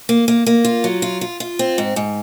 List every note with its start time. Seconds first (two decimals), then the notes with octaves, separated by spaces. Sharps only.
0.09 A#3
0.28 A#3
0.46 A#3
0.65 F4
0.84 F#3
1.02 F4
1.21 F4
1.40 F4
1.59 C4
1.78 G#2
1.96 G#2